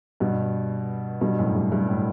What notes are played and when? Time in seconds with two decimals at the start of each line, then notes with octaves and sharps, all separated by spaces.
0.20 G2 B2
1.21 G2 B2
1.39 F#2 A2
1.55 G2
1.72 G2
1.88 A2